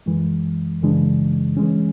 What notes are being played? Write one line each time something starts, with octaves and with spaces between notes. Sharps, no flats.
F#2 E3 G#3
F#2 C#3 E3 G#3 D4
E3 G#3 C#4